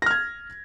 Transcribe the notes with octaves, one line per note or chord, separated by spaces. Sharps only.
F6 G#6 A#6